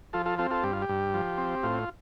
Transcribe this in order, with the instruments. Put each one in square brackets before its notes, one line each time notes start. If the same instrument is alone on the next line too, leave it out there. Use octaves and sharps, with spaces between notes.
[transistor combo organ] F3 F4 A4
F4 A4
C4 F4 A4
F4 A4
G2 G4
F4
G4
G2
F3
C4
A2 F4